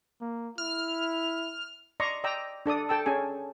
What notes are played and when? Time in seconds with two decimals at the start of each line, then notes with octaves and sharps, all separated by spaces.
0.21 A#3
0.58 E4 F6
2.00 D5 D#5 A#5 C6 C#6
2.24 D5 D#5 G5 A#5 E6
2.66 D4 A4 D5 D#6
2.89 A4 G5 A5 E6
3.06 C#4 G#4 G#5